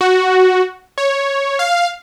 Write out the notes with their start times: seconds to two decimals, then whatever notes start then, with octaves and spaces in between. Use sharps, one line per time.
0.01 F#4
0.98 C#5
1.59 F5